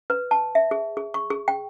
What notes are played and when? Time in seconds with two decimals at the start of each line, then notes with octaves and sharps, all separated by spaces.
0.10 B4
0.31 A5
0.55 E5
0.71 G#4
0.97 G#4
1.14 C#6
1.30 G#4
1.48 G5